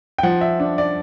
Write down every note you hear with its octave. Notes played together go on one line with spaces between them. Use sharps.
G5
F3 F#5
E5
D4
D5